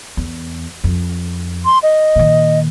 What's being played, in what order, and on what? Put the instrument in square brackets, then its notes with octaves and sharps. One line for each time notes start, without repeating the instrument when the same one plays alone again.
[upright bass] E2
F2
[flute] C6
D#5
[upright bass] A#2 D#3